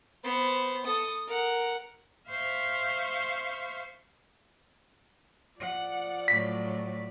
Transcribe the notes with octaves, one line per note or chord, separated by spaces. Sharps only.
B3 C5
A4 D#6
A#4 F#5
C5 E5 F5 C6 C#6
F3 D5 F#5
A2 F#3 B6